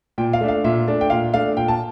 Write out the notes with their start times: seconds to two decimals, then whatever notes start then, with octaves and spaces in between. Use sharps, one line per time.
0.18 A#2 G5
0.33 F5
0.41 A3 D4
0.48 F5
0.64 A#2 E5
0.88 A3 D4
1.01 G5
1.10 A#2 F5
1.34 A3 D4 F5
1.57 A#2 G5
1.68 A5